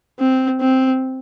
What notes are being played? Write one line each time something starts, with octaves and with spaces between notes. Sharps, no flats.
C4
C4